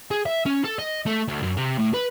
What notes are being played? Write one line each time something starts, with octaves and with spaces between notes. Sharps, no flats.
G#4
E5
C#4
A4
D#5
A3
D2
F#2
C3
A2
B4